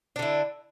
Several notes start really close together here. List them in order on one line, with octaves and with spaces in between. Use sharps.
D4 D3 E4